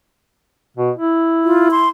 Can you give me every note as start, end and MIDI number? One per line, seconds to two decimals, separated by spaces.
0.77 0.90 47
0.97 1.91 64
1.44 1.68 65
1.71 1.89 84